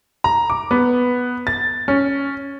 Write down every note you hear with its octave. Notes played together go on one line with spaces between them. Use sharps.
A#5
D6
B3
A6
C#4